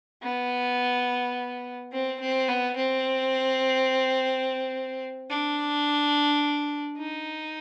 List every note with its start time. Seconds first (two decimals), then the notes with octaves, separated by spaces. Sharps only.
0.22 B3
1.92 C4
2.20 C4
2.48 B3
2.76 C4
5.30 D4
6.98 D#4